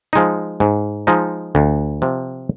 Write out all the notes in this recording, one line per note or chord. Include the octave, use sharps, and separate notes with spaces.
F3 G#3 D#4
G#2
F3 G#3 D#4
D2
C3 F3